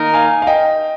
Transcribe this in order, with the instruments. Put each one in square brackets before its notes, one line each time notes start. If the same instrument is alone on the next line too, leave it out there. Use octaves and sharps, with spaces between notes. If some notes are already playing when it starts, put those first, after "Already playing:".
Already playing: [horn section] D#3 A#3 D#4 A#4
[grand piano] F5 G#5
F5
D#5 G5